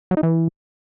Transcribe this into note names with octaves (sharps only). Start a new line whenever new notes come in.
F#3
D#4
E3